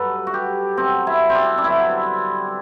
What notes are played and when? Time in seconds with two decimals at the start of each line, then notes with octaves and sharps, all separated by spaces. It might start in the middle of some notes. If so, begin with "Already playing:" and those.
Already playing: G2 F#3 A4 B4
0.27 F#4
0.34 G4
0.77 B2 F#3 C4
1.07 E4
1.29 C4
1.35 D4
1.58 D4
1.64 G2 D3 F#3 E4